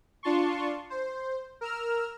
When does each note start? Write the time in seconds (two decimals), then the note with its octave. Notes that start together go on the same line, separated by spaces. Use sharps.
0.23 D4 F4 A5 C6 C#6
0.90 C5
1.61 A#4 E6 F6